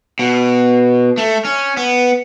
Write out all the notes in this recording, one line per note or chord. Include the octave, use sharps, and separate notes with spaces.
B2
A3
C#4
B3